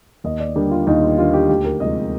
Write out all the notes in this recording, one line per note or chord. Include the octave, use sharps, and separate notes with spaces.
D#2 D#5
D5
D3 G3 A#3 D4 G4
F4
D#2 D#4
F4
D3 G3 A#3 D4 F4
G4
D2 G4
A#4
C3 F3 G#3 D#5